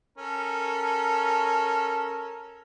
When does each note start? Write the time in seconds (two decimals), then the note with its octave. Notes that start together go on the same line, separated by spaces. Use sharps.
0.18 C#4 A4 A#4